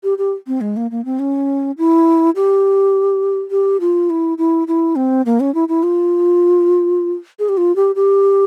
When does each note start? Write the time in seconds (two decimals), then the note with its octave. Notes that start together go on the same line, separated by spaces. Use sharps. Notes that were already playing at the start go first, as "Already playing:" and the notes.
0.04 G4
0.18 G4
0.47 C4
0.61 G#3
0.77 A#3
0.91 A#3
1.05 C4
1.19 C#4
1.78 E4
2.36 G4
3.51 G4
3.80 F4
4.10 E4
4.38 E4
4.68 E4
4.96 C4
5.26 A#3
5.40 C#4
5.55 E4
5.69 E4
5.83 F4
7.39 G#4
7.49 G4
7.57 F4
7.76 G4
7.96 G4